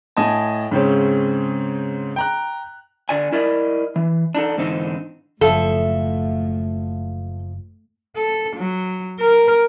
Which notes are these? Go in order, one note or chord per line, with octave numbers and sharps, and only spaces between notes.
A2 D#5 G#5 A5
G#2 C#3 C4 C#4
G5 A#5 F#6
D3 D5 G#5
E4 A#4 D5 D#5
E3
D4 D#4 A4
G#2 D3 E3 C4 D#4
F#1 A2 F3 A4 E5
A4
F#3
A#4